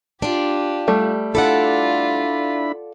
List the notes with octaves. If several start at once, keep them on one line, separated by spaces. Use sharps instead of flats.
D4 F4 G4
G3 A3
D4 E4 F4 A4 D5 F#5 B5